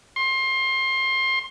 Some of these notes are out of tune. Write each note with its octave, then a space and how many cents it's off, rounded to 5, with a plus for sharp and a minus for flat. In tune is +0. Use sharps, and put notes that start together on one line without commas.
C6 +25